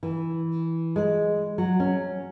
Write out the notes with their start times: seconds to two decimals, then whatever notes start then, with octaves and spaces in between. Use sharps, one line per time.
0.03 E3
0.96 G#3
1.58 F#3
1.80 C#4